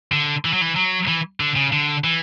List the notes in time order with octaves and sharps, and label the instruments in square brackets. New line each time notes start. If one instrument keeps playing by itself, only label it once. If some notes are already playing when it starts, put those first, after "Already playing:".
[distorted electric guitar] D3
E3
F#3
E3
F#3
E3
D3
C#3
D3
E3